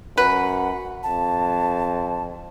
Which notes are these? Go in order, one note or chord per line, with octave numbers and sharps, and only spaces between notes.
F#2 B4 F#5
F2 A5